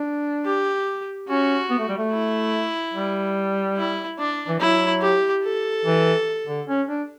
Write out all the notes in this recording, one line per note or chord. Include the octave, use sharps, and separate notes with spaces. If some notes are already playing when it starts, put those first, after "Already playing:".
Already playing: D4
G4
C#4 F#4
B3
A3
G3
A3
E4
G3
E4
D4
E3
F#3 E4
G4
A4
E3
D3
C#4
D4